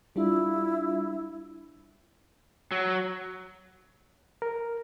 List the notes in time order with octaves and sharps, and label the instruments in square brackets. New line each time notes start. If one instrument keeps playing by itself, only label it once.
[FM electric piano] G3 D4 F4 [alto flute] E4
[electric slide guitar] F#3
[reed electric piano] A#4